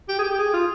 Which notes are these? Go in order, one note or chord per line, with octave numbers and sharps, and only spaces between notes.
G4
G#4
G4
G#4
F4